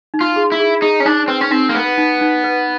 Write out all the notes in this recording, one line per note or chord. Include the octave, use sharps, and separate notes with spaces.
D#4
F4
G#4
E4
G#4
D#4 G#4
C#4
D4 D#4
C4 B4
C#4
C4 D#4
A#3
B3 B4
D#4
D#4
B4